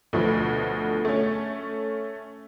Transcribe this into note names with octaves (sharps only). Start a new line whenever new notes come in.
D2 B2 F3 A3 B4
A3 C#4